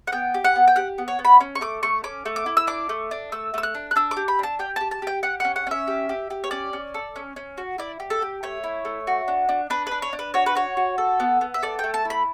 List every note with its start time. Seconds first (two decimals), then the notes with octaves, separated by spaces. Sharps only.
0.07 F#5
0.12 B3 G5
0.34 G4
0.44 F#5
0.56 B3
0.67 G5
0.76 G4 F#5
0.98 B3
1.08 C#5
1.19 B3
1.25 B5
1.40 C#4
1.55 C#6
1.61 A3 D6
1.83 A3 C#6
2.04 C#4 D6
2.25 A3
2.36 D6
2.46 E4
2.57 E6
2.67 D4 D6
2.89 A3
3.11 D4
3.32 A3 E6
3.54 A3 E6
3.63 F#6
3.75 D4
3.91 F#6
3.96 D4 E6
4.11 D6
4.17 G4
4.28 B5
4.39 D4 A5
4.59 G4 G5
4.76 G4 A5
4.91 A5
5.02 G4 G5
5.23 G4 F#5
5.40 C#4 F#5
5.56 F#5
5.67 C#4 E5
5.87 G4
6.09 G4
6.30 G4
6.44 C#5
6.51 C#4 D5
6.73 C#4
6.94 A4
7.16 C#4
7.36 C#4
7.58 F#4
7.78 E4 D5
8.00 G4
8.10 A4
8.22 G4
8.43 A3 C#5
8.64 E4
8.85 A3
9.07 F#4
9.28 D4
9.49 D4
9.70 D4 B4
9.87 D4 B4
10.02 C#5
10.13 D4
10.19 B4
10.34 F#4 C#5
10.46 B4
10.55 F#4 C#5
10.77 F#4
10.98 A4
11.20 B3
11.41 B3
11.54 E5
11.62 A4 D5
11.79 A3 G5
11.94 A5
12.05 E4
12.10 B5